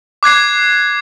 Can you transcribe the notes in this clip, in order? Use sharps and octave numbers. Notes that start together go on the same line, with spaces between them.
D6 F#6 G#6 C7